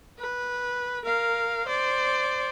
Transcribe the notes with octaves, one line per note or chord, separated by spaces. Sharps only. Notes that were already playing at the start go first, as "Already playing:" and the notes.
B4
A#4 F5
C5 D5